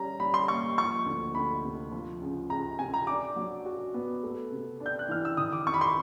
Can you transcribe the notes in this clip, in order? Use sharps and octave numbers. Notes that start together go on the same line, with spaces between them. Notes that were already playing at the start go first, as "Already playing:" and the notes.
Already playing: G3 C#4 A#5
G3 B5
C6
A#3 C#6
F3 C#6
D2
D2 B5
C3
F3
C#2
C#2 A#5
C3 G#5
A#5
D4 D6
F#3
F#4
B3
A3
C3
D4
G6
F#6
E3 F6
E6
D#3 D#6
D6
F2 C#6
B5
C6